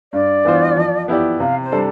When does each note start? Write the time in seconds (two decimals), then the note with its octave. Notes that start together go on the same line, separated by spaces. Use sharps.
0.13 G2 D5
0.45 E3 B3 F4 C5
0.77 F3
1.08 B3 E4 G4 D5
1.40 C3 F5
1.62 C5
1.72 G3 D4 A4